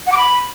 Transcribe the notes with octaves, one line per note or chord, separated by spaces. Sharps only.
F#5
D6
B5